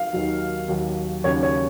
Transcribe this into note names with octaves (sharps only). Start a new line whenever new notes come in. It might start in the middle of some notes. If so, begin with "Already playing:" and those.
Already playing: F5
D#2 D#3 F#3
D#2 D#3 F#3
D#2 C#3 F#3 C#5
C#5